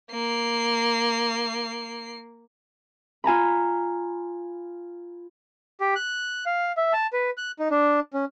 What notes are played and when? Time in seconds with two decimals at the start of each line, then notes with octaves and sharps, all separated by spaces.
0.11 A#3 C7
3.24 F4 G#5 A#5 B5
5.80 G4
5.95 F#6
6.46 F5
6.77 E5
6.93 A5
7.13 B4
7.37 F#6
7.59 D#4
7.71 D4
8.14 C#4